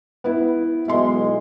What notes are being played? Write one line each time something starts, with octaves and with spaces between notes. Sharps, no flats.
B3 E4
B1 E2 G#3 E5 C6